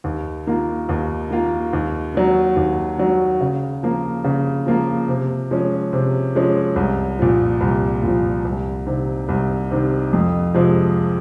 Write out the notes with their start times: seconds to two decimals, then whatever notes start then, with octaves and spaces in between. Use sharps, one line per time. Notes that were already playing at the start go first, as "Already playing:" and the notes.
0.04 D#2
0.47 D#3 A#3 F4
0.89 D#2
1.30 D#3 A#3 F4
1.73 D#2
2.14 D#3 F#3
2.56 D#2
2.98 D#3 F#3
3.41 C#3
3.83 F3 A#3 F4
4.24 C#3
4.66 F3 A#3 F4
5.08 C3
5.51 F3 G#3 C#4
5.93 C3
6.35 F3 G#3 C#4
6.76 C2
7.19 A#2 F3
7.61 C2
8.03 A#2 F3
8.45 C2
8.86 C3 D#3
9.29 C2
9.71 C3 D#3
10.13 F2
10.54 C3 F3 G#3